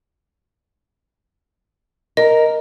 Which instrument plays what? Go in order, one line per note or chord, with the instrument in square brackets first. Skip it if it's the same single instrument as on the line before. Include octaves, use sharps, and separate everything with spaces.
[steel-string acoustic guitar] A#4 [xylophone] D#5